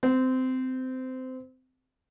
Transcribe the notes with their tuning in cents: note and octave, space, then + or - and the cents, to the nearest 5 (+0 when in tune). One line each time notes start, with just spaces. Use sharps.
C4 -20